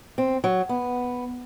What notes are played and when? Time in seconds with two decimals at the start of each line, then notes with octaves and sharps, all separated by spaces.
0.18 C4
0.44 F#3
0.69 B3